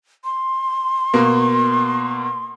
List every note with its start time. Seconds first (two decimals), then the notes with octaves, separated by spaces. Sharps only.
0.24 C6
1.14 B2 A#3